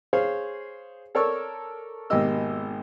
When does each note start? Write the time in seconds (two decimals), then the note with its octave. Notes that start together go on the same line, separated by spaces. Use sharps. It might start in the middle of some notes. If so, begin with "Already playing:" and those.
0.13 G#4 C5 C#5 F5
1.15 A4 A#4 C#5 D5 C#6 E6
2.10 G#1 B2 A#3 G4 D#5 E6